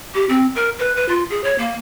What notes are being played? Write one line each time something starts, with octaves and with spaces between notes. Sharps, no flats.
G4
C4
A#4
B4
B4
F4
G#4
C#5
A#3